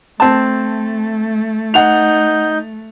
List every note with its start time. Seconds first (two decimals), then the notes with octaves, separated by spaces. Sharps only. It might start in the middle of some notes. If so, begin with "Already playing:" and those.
0.20 A3 C4 A5
1.74 D#4 F#5 G6 F7